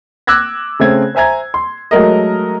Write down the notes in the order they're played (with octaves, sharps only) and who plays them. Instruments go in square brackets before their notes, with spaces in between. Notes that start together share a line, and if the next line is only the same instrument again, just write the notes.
[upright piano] D6 E6 F#6 G#6 A#6
C#3 A3 C4 G#6
C5 E5 G#5 A#5 G#6
C6
F#3 G#3 A3 A#4 D#5